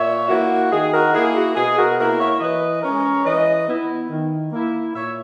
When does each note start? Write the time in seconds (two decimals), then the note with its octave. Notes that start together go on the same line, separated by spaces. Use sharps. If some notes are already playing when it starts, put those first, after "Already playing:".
Already playing: A#2 C#5 E5
0.29 A#3 E4 F#4
0.72 D#3 G#4
0.92 F#4 A#4
1.13 A#3 E4 G#4
1.34 F#4
1.56 B2 G#4
1.77 F#4 A#4
1.98 A#3 E4 F#4 A#4
2.19 C#5 E5
2.40 E3 B4 D#5
2.83 G#3 C#4 A#4 C#5
3.25 E3 B4 D#5
3.68 B3 E4
4.10 D#3
4.52 A#3 E4
4.95 A#2 C#5 E5